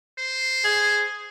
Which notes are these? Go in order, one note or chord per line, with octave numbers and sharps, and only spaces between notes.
C5
G#4